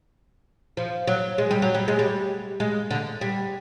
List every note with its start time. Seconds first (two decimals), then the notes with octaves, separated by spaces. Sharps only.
0.77 F3
1.07 F#3
1.38 G#3
1.51 G3
1.62 F#3
1.74 G3
1.88 G#3
1.99 G3
2.60 G#3
2.91 D3
3.21 G3